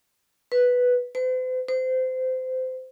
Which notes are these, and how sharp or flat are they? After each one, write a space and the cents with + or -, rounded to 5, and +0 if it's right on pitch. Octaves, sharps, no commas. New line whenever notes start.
B4 +0
C5 -45
C5 -25